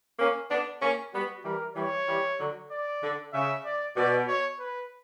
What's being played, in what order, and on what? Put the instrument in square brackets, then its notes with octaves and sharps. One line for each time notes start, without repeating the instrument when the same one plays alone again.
[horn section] A#3 C#4
B3 D4
A#3 C#4
[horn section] G3 B3 [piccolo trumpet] F#4
[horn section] E3 G3 [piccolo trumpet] A#4
[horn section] E3 G3 [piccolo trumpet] C#5
[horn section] E3 G3
D3 F#3
[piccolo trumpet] D5
[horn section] D3
[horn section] C#3 [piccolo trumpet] E5
[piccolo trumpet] D5
[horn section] B2 [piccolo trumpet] D5
[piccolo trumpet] C#5
B4